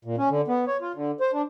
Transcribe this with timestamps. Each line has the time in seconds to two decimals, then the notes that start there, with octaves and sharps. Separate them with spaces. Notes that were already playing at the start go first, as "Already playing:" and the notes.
0.05 A#2
0.18 C#4
0.30 D3
0.48 B3
0.67 C#5
0.81 F4
0.95 D3
1.20 C5
1.33 D4